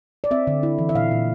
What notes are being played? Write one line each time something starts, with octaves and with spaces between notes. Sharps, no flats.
D5
C4 E5
D3
E4
E3
E5
A#2 F5
A#2